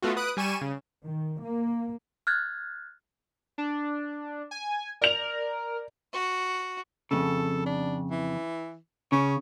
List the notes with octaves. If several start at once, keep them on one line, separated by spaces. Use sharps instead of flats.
A3 B3 F4 F#4
B4 D#6 F#6 D7
G3 G#5 C#6 D#7 E7
C#3
D#3
A#3
F6 F#6 G#6 A6
D4
G#5
A#4 D5 F7
F#4
F2 A2 C#3 A4
D4
E3
C#3 C#4